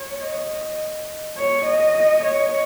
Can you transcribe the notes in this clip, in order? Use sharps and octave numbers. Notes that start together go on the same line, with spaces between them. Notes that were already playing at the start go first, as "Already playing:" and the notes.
Already playing: C#5
D#5
C#5
D#5
C#5